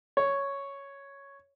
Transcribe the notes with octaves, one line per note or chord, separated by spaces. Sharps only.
C#5